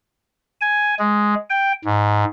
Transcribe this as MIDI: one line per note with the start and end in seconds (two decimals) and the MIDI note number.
0.61 0.95 80
0.99 1.35 56
1.50 1.73 79
1.85 2.24 44